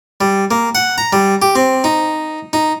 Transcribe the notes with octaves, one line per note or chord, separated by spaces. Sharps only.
G3
A#3
F#5
A#5
G3
G4
C4
D#4
D#4